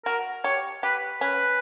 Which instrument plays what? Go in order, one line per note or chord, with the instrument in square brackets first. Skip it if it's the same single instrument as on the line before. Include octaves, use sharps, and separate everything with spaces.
[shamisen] F#4 [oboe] A#4
[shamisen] G4 [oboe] C#5
[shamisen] G4 [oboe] B4
[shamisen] C#4 [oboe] B4